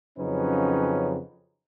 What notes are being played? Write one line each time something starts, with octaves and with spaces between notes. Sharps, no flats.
F2 C#3 F#3 C#4 D#4 B4